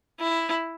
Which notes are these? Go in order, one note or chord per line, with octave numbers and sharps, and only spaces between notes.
E4